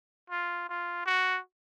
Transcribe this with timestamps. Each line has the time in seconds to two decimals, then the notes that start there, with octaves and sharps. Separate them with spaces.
0.30 F4
0.69 F4
1.06 F#4